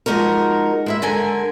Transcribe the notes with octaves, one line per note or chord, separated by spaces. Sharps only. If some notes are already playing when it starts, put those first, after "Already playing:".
F3 G#3 C#4 D#4 F#4 A#4
G#3 E4 E5
D3 G#3 A#4 G#5